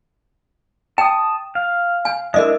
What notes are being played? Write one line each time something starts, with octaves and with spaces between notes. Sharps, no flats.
G5 A5 D#6
F5
G#5
G#3 D4 E4 A#4 D#5 E5